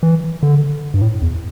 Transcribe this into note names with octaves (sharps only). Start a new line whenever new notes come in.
E3
D3
G2
A2
E2